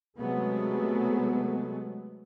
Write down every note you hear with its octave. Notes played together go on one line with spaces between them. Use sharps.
C3 F#3 G#3 A3 B3